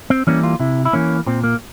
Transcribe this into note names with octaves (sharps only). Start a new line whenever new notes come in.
C4
E3 G3 A#3 C#4
F4
C3 E4
E4
E3 A#3 C#4
A#2 C4
A#3